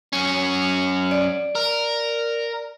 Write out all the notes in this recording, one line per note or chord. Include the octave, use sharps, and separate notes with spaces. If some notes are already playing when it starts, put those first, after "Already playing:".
F#2 C#4
D5
A#4